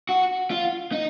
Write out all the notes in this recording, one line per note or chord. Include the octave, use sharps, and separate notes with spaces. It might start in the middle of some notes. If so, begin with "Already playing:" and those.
F#4
F4
D#4